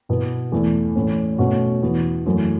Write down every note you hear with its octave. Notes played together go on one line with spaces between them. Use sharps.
B2 B3 E4
E2 E3 A3 E4
A2 E3 C#4
B2 A3 C#4 F#4
E2 E3 B3 F#4
F#2 E3 A3 F#4